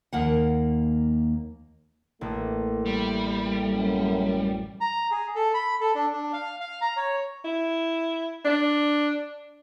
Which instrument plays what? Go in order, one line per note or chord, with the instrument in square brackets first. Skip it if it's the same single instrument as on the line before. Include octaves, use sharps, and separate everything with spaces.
[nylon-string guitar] D#2 A#3 F#5
[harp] A1 [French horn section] A3 A#3
[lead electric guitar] G3
[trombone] F#2
[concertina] A#5
G#4
A4
B5
A4
D4
D4
F5
F5
A#5
C#5
[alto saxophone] E4
D4